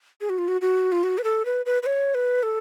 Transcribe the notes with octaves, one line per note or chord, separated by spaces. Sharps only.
G#4
F#4
F4
F#4
F#4
F4
F#4
B4
A4
B4
B4
B4
C#5
B4
A4